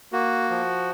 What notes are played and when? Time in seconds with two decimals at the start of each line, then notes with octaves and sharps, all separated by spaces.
0.12 A#3 F#4
0.50 F3